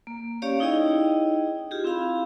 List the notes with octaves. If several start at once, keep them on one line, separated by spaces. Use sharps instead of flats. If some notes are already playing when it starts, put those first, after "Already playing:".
A#3
C#4 G4 C#5 D5 F5
D#4 E4 G#4 D#5 G5
F4 G4 G#4
C4 E4 F5 B5